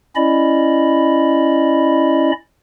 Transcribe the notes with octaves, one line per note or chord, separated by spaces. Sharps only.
C#4 E4 D5 D#5 B5